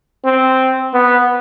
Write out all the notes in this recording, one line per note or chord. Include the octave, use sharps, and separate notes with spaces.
C4
B3